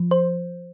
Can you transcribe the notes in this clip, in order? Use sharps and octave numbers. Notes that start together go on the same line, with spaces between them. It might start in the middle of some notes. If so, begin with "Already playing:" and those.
Already playing: F3
C5